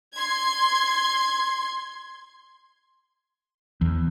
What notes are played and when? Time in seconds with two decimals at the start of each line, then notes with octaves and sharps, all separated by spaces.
0.14 C6 G#6
3.81 E2